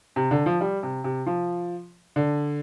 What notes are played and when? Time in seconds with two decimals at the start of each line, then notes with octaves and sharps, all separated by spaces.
0.16 C3
0.31 D3
0.46 F3
0.61 G3
0.83 C3
1.04 C3
1.26 F3
2.16 D3